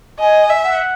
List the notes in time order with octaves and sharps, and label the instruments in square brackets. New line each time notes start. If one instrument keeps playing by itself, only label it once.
[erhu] D#5 [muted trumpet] G#5
[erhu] E5
[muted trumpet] F#5